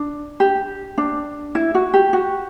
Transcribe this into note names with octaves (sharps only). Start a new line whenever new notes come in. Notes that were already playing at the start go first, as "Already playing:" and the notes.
Already playing: D4
G4
D4
E4
F#4
G4
F#4